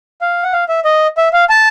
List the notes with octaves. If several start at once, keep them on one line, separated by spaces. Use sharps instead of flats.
F5
F#5
F5
E5
D#5
E5
F5
A5